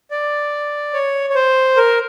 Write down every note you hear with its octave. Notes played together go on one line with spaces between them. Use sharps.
D5
C#5
C#5
C5
A#4